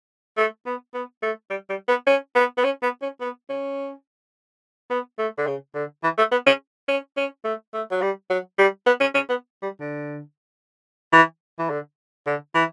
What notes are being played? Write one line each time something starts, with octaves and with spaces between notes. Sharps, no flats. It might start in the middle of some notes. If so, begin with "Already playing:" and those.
A3
B3
B3
A3
G3
G3
B3
C#4
B3
B3
C#4
B3
C#4
B3
C#4
B3
A3
D3
C#3
D3
E3
A3
B3
C#4
C#4
C#4
A3
A3
F#3
G3
F#3
G3
B3
C#4
C#4
B3
G3
D3
E3
E3
D3
D3
E3